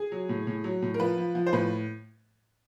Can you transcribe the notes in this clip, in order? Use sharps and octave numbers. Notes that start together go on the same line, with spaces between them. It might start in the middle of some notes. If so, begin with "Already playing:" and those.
Already playing: G#4
F#3
A2
A2
F#3
A2
A#4
F3 B4
F3
F3
C5
A2 B4